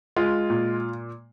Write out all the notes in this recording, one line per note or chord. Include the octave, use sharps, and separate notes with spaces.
G#3 F4
A#2